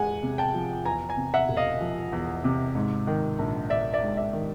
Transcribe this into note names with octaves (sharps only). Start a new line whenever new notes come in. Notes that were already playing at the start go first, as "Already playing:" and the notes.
Already playing: E2 G#3 F#5 G#5
C3
G5 A5
F3
E2 G#5 A#5
G#5 A#5
C3
E5 F#5
E1
D#5 F5
F3
E2
C3
G#2
D#3
A#1
A#1 D5 E5
D5 E5
G#2
D5 E5
D#3